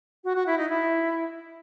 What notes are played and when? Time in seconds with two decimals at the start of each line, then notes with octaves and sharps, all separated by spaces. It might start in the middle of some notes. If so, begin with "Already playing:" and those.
0.24 F#4
0.35 F#4
0.46 E4
0.58 D#4
0.69 E4